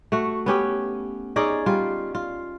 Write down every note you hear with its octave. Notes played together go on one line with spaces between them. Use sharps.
A3 F#4
B3 C#4 G4
C#4 D#4 G#4 D5
G3 F4
F4